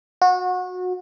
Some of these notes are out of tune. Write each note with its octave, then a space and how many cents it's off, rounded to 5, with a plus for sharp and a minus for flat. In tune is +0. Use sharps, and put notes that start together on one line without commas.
F#4 -25